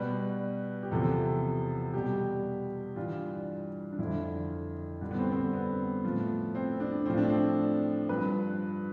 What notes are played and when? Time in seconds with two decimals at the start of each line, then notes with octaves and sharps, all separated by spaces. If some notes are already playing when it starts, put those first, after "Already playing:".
Already playing: B2 G3 B4
0.83 G4
0.91 E2 C3 F3 A4
1.94 B2 G3 G4
2.96 G2 E3 G3 F4
3.93 D4
3.99 F2 D3 F3 E4
5.01 G2 D3 G3 D4
5.11 B3
5.19 C4
5.32 C4
5.35 B3
5.53 B3
6.04 A2 F3
6.55 C4
6.80 D4
7.06 A2 F3 C4
7.18 D4
7.29 C4
8.09 G2 F3 B4